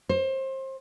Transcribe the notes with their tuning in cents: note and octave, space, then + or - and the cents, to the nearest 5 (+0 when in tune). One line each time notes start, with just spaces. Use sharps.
C5 +30